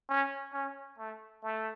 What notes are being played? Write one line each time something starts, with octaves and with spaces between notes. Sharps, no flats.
C#4
C#4
A3
A3